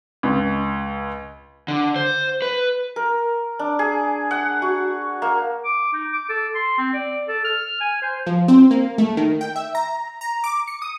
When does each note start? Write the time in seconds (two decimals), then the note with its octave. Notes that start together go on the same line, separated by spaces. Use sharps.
0.23 C#2
1.68 D3
1.96 C5
2.42 B4
2.96 A#4
3.59 D4
3.79 G#4
4.31 F#5
4.62 F#4
5.22 A#3
5.64 D6
5.93 D#4
6.13 D6
6.29 A4
6.55 C6
6.78 C4
6.93 D5
7.28 A4
7.44 F6
7.80 G#5
8.02 C5
8.26 F3
8.48 C4
8.71 A#3
8.98 A3
9.17 D#3
9.41 G5
9.56 E5
9.75 A#5
10.21 A#5
10.44 D6
10.67 C#7
10.82 D#6